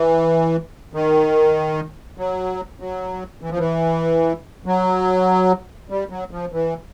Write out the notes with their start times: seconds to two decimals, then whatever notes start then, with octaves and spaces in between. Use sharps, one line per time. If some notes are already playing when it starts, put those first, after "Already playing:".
Already playing: E3
0.94 D#3
2.18 F#3
2.80 F#3
3.41 E3
3.50 F3
3.58 E3
4.66 F#3
5.90 G3
6.10 F#3
6.31 F3
6.52 E3